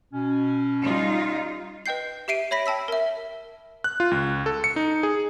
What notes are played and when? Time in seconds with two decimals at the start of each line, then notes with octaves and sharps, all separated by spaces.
0.12 B2 C#4
0.82 G3 D#4 F4
1.86 B4 D#5 G5 G6 C7
2.28 G4 E5 C7 D7 D#7
2.51 C#5 E5 B5 A#6 B6
2.66 G5 A5 E6 B6
2.88 A#4 E5
3.84 F#6
4.00 F4
4.11 C#2
4.46 A4
4.64 C#7
4.76 D#4
5.03 G#4